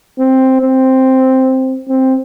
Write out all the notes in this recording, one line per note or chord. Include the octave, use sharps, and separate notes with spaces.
C4
C4
C4